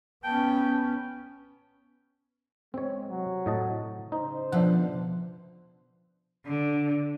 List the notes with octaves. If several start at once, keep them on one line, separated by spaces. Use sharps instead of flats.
B3 C#4 G5 A5
G#3 C4 C#5
C3 F#3
A2 D#5 A5
C#3 D#4 C5
B2 D3 F3 D4 E5 F#5
D3